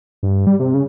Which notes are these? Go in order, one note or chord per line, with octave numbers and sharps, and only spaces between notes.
G2
G3
C3
C#3